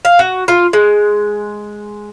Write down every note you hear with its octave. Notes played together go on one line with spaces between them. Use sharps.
F5
F#4
F4
G#3